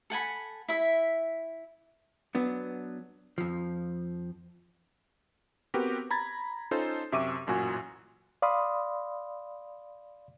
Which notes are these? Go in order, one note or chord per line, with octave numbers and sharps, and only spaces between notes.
A4 F#5 G#5 B5
E4 E5
F#3 B3 D4
F2 F3
B3 C4 F#4 G4 A#4 B4
A#5 B5 G#6 A6
C#4 D#4 F4 A4 C5
F#2 C3 E5 C#6 D6 D#7
A1 F#2 A#2 F#4 G#5
D5 F5 B5 C6 D#6